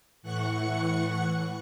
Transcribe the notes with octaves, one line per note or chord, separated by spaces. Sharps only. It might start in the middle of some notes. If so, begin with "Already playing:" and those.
A2 E3 F#5 C#6 F#6 C#7